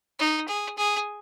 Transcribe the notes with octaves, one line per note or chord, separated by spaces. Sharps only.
D#4
G#4
G#4